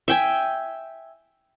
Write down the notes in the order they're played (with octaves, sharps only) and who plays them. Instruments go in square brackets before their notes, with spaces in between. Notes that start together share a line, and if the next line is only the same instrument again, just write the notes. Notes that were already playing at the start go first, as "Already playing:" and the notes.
[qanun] E5 G5 G#5